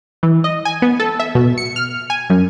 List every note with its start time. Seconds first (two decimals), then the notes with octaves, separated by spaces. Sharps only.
0.23 E3
0.44 D#5
0.65 G#5
0.82 B3
1.00 A4
1.20 E5
1.35 B2
1.58 C#7
1.76 F6
2.10 G#5
2.30 F#2